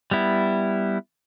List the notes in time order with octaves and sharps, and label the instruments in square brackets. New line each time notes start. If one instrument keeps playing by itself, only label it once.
[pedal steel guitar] G3 B3 E4